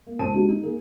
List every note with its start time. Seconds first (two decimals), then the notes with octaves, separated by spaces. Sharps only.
0.07 A#3
0.19 C#2 C5 A5 D#7
0.33 G#3 D4 D#4 F#4 G4
0.48 D#4
0.62 D#3 A#3 G#4 A#4